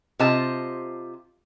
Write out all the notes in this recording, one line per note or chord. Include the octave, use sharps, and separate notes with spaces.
C3 F4 C5 D#5 A5